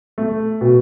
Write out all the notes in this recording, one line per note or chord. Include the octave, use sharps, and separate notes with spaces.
A3
B2